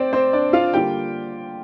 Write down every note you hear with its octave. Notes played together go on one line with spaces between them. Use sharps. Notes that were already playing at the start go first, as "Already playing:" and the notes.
Already playing: C4 C5 D5
C4 C5
D4 D5
F4 F5
D3 G3 A#3 F4 G4 G5